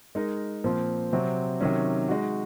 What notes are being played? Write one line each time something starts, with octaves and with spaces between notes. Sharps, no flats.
G#3 D#4 A#4
A#2 F3 C4
C3 F#3 C4 F#4
C3 D#3 F#3 C#4
G#3 D#4 F#4